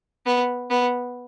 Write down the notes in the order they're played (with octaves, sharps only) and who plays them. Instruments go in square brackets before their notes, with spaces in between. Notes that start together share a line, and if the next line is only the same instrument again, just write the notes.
[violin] B3
B3